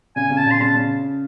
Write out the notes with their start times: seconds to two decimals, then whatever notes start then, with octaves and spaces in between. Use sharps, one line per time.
0.16 C#3 G#5
0.30 C#3
0.38 A5
0.46 C#3
0.51 C6
0.61 C#3 A5
0.75 C#3